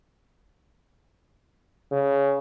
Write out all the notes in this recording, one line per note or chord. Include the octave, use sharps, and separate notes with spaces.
C#3